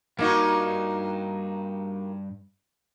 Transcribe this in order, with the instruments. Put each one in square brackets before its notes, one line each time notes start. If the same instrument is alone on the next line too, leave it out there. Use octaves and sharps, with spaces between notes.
[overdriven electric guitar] G2 [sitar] A#3 D#4 F#4